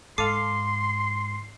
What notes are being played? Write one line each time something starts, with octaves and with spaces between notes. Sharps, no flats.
G#2 A4 F5 C6 D6 C7 D#7